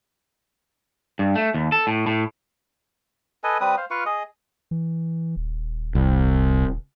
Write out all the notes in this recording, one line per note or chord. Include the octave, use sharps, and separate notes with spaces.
G2
A3
D#2
A4
A2
A2
A4 B4 D#5 G#5
G3 C4 B4 D#6
C5 F5
F4 B4 F5 C#6
G#4 D#5
E3
D#1
C2